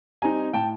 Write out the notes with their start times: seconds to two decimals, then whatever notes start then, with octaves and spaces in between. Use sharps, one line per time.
0.22 G3 C4 D#4 G#5 A#5
0.53 A2 G5 A5